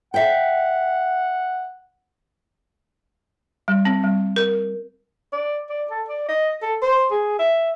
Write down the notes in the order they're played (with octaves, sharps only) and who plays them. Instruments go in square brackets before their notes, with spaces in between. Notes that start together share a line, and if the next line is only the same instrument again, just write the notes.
[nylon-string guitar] E5 G5 [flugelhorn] F#5
[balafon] G3
C4
G3
A#4
[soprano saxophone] D5
D5
A4
D5
D#5
A4
C5
G#4
E5